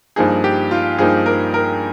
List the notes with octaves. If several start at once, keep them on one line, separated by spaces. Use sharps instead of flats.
G2 F3 A#3 D#4 G#4
G4
F4
G2 F3 A#3 D#4 G#4
A#4
A#4